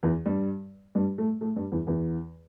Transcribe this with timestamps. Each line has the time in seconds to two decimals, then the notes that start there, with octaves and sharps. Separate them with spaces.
0.03 E2 E3
0.26 G2 G3
0.95 G2 G3
1.18 A2 A3
1.41 A2 A3
1.56 G2 G3
1.72 E2 E3
1.87 E2 E3